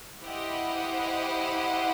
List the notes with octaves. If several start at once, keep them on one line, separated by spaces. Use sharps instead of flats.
E4 G4 C5 D#5 F#5